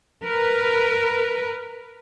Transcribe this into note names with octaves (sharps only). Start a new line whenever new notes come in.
A#4 B4